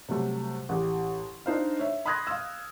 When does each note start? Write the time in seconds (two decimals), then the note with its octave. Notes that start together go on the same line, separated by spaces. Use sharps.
0.09 C3 F#3 G3 A3
0.69 A1 G4
1.46 D4 D#4 C5 F5
1.79 C#5 E5
2.06 B5 C6 D#6 F#6 G#6 A#6
2.27 F5 E6